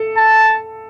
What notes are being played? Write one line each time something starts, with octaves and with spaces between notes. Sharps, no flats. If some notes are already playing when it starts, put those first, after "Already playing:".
Already playing: A4
A5